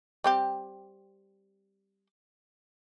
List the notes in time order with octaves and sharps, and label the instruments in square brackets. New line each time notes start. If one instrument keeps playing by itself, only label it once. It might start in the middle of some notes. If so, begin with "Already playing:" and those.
[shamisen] G3 C4 G4